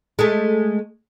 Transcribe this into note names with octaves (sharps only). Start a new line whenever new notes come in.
G#3 A3